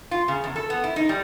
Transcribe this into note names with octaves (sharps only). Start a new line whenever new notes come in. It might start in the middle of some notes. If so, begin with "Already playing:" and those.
F4
C#3
E2
A4
B3
E4
D#4
G3